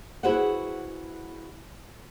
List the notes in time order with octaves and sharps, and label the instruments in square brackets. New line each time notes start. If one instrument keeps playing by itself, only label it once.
[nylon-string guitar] E4 F#4 G#4 B4 C5 F#5